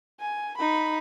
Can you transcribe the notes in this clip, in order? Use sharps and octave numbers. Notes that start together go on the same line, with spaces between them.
G#5
D#4 B5